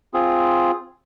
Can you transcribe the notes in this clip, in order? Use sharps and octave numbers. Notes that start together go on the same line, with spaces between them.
C4 F4 G#4